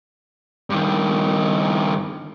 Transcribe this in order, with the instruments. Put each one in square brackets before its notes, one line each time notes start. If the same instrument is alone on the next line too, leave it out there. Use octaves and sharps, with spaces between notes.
[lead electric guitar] G2 D#3